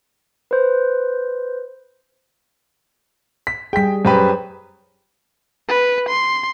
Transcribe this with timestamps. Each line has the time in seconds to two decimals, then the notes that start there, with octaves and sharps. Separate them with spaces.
0.51 B4 C5
3.47 B6
3.73 G3 G#4 G5 B6
4.05 F#2 G4 B4 C5
5.69 B4
6.09 C6